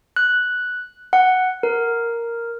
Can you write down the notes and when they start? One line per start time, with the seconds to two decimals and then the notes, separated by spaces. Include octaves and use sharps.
0.16 F#6
1.13 F#5
1.63 A#4